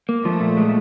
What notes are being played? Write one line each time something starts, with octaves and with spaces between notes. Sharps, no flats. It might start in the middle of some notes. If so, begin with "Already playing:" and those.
A#3
F3 A3
A#2
G#3